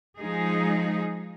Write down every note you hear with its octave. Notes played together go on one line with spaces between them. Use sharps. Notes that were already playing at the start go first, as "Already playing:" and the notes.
F3 G#3 D#4 G#4